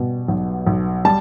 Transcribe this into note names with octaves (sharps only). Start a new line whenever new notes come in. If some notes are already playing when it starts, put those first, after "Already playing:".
Already playing: B2 G3
B1
B1
G3 A5